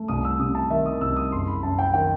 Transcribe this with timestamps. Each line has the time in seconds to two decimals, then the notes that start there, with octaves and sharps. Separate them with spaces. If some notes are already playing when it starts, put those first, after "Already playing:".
Already playing: A3
0.08 C2 D#6
0.25 E6
0.39 C3 D#6
0.55 A5
0.70 D#3 E5
0.86 D#6
1.01 C2 E6
1.16 D#6
1.32 F#1 C6
1.48 B5
1.63 F#2 A5
1.79 G5
1.94 D#3 G5